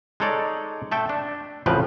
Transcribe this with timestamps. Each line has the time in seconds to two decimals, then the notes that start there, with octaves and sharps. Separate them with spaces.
0.20 G#3 D#4 A4 C#5 D5
0.91 A3 A4 E5 G5
1.09 D4
1.66 A1 F2 C#3 F3 B4 G5